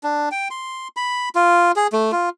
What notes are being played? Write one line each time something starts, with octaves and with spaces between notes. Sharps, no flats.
D4
G5
C6
B5
F4
G#4
A3
F4